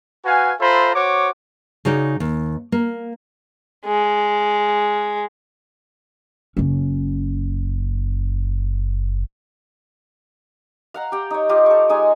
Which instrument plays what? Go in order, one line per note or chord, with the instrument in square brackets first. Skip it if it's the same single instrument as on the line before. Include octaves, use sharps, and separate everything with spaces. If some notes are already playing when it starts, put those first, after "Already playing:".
[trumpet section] F#4 B4 F5 G#5
F4 A4 C5 E5 A#5 B5
F#4 C5 C#5 D6
[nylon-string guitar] C#3 D#4 F#4 C#5 D5
D#2
A#3
[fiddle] G#3
[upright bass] F#1 C#4
[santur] F5 F#5 A#5
G4 G5
D#4 C#5
F4 G4 D#5 F5
A4 C#6
G#3 D#4 G#4 G#5